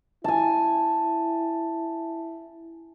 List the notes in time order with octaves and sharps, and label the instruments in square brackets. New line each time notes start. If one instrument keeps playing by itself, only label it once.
[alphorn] E4 [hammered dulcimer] G#5 A5